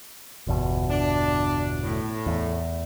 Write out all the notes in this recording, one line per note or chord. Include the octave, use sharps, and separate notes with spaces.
G1 E2 B2
D4
A2
E2